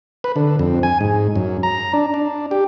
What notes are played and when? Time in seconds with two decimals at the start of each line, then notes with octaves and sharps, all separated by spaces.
0.24 B4
0.36 D3
0.59 F2
0.83 G#5
1.01 G#2
1.36 F#2
1.63 A#5
1.93 D4
2.14 D4
2.51 G4